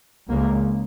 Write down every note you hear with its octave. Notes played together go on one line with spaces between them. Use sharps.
C#2 C#3 A#3